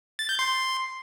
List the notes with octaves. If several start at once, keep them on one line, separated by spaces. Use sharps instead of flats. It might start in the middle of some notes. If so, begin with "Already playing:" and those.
A6
G6
C6